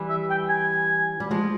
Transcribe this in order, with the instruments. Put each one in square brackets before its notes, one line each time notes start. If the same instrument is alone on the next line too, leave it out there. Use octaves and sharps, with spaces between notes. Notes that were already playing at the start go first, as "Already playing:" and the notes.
Already playing: [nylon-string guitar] E3 G3
[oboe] E5
G5
G#5
[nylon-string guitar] G3
F3 G#3